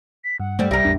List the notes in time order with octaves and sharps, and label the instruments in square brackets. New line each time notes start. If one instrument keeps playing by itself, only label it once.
[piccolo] B6
[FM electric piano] G2 [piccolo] F#5
[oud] G3 C4 [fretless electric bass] A3
[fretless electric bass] C2 [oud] G3 A#4 [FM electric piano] E5 [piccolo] A#6
[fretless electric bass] A1 E2 D4